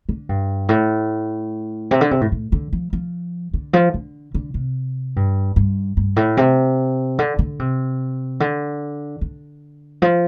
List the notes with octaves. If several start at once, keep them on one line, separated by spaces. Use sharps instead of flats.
D3
G2
A2
C3
D3
C3
A2
A2
D3
F3
F3
D3
F3
D3
D3
C3
G2
G2
G2
A2
C3
D3
D3
C3
D3
D3
F3